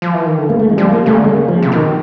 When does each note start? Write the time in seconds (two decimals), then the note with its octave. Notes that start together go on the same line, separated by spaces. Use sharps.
0.02 F3
0.14 E3
0.26 D#3
0.38 D3
0.50 C#3 A#3
0.59 A3
0.69 E3 G#3
0.77 F3 G3
0.93 A#3
1.06 C#3 A3
1.16 D3 A3
1.24 G#3
1.29 C#3 A#3
1.48 F3
1.62 C3
1.72 B2
1.76 D#3